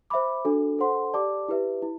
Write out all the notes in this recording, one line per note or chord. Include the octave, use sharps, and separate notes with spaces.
C5 E5 B5 D6
D4 F#4 A4
A4 C5 F#5 C6
G4 D5 A5 D6
E4 G4 B4 E5
E4